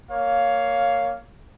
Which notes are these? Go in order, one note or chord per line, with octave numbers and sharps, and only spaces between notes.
A#3 C#5 F5